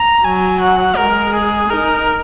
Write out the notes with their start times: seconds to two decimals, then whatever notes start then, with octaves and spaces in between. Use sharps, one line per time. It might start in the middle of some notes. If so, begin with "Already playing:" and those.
Already playing: A#5
0.24 F#3 G#5
0.60 F#5
0.97 G#3 A#4
1.34 G#4
1.70 D#4 A#4